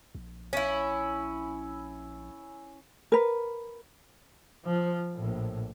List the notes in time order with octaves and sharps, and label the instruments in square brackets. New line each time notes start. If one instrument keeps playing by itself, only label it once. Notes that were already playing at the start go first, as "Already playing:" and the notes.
[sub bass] A#1
[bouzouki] C#4 E4
[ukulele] A#4 B4
[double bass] F3
A#1 A2